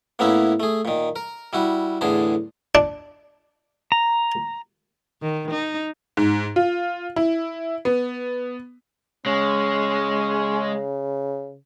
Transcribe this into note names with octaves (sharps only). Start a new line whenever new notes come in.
A2 A#3 B3 C#4 E4 E5
A3 G#4
A#2 D#3
A#4
G3 E4 F#4
E2 A2 D3 G#4 A5
D4
A#5
D#3
D#4
G#2
F4
E4
B3
C#3 G#3 C#4